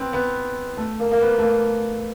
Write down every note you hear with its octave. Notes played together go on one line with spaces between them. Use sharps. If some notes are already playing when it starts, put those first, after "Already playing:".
Already playing: B3 C4
B3
A3
A#3
A#3
B3
A3
A#3